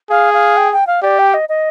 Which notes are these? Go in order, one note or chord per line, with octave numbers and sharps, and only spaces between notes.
G#4 F5
F5
G5
G5
F5
G4 D5
G5
D#5
D#5